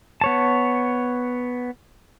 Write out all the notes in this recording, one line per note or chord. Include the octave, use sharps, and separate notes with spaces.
B3 C#5 A5